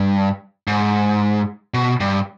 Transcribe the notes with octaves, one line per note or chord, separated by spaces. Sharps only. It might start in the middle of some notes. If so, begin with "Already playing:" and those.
Already playing: G2
G#2
B2
G2